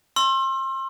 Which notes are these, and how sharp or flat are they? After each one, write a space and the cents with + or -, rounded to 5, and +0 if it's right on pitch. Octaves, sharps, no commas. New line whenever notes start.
C6 +30 E6 +25